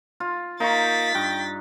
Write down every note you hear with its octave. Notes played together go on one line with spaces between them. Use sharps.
F4
A#3 D#4 C#6 A6 B6
G2 G5